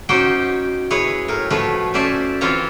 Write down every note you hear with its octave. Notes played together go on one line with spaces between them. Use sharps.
C#4 D#4 F#4 G4 C5 G5
E4 G#4 B4 C#5
A2 A#4
F3 A3 F#4 B4 C#5
C#4 C5 D5 E5 G#5 A5
E3 C4 F4 C#5 A#5